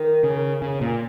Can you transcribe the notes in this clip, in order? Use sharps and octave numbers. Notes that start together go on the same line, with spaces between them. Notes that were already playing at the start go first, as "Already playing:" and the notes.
Already playing: D#3
C#3
C#3
A#2